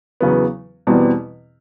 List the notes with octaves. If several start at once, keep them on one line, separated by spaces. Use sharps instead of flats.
E2 C#3 F#3 B3
E2 B2 G3 C4